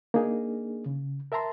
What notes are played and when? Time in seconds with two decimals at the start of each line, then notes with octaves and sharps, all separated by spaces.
0.14 A#3 D4 D#4 G#4
0.86 C#3
1.32 A#4 E5 A5 A#5 C6